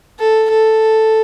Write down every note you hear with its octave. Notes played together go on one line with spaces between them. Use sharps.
A4
A4